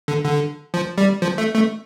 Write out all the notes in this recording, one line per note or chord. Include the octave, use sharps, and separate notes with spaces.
D3
D3
F3
G3
F3
A3
A3